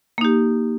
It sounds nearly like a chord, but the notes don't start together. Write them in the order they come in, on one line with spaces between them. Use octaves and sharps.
A#3 D#4 G4